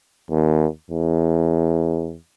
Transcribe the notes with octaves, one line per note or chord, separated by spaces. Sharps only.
D#2
E2